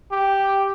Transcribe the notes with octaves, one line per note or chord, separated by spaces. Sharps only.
G4